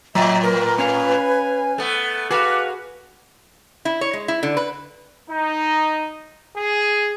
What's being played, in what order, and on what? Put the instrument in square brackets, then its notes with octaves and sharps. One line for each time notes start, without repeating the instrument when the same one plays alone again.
[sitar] A2 [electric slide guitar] F#3 [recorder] D#5 [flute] E5
[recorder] A#4 [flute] B4
[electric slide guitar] C#4 C#5 F5 [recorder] G#5
[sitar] A3 B3
[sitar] F#4 [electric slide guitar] G#4 A4 F5 [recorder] B4 [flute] D6
[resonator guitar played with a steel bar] E4
C#5
G#3
E4
D3
B4
[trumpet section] D#4
G#4